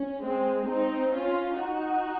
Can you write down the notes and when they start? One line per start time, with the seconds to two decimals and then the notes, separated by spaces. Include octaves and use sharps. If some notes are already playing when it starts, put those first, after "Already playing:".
Already playing: C#4
0.22 G#3 C4
0.68 C4 D#4
1.14 C#4 F4
1.61 D#4 F#4